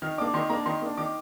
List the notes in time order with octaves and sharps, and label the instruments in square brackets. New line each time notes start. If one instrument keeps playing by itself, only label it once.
[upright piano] D#3 F6
A#3 D4 D6
D#3 C6
A#3 D4 A#5
D#3 C6
A#3 D4
D#3 D6